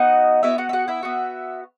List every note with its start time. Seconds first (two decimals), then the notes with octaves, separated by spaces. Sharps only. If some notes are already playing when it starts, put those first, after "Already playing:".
Already playing: B3 D#4 F#4 D#5
0.43 B3 E4 F#4 E5
0.58 F#4 F#5
0.69 E5
0.73 F#4 F#5
0.88 E4 E5
1.03 B3 F#4